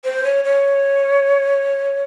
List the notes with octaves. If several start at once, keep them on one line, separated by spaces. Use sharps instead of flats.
C5
C#5
C#5